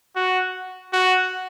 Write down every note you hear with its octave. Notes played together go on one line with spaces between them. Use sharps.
F#4
F#4